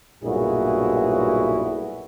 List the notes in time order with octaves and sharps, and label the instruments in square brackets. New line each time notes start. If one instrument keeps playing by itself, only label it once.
[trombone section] B1 G2 A#2 E4 F#4 G#4